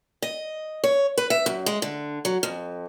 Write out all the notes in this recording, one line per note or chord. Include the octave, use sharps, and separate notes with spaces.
D#5
C#5
B4
E5
F#2
G#3
D3
F#3
F2